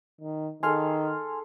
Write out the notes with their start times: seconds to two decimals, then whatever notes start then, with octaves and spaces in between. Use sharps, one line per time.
0.21 D#3
0.63 D#3 G#4 A4 F5 G#5 C6 F6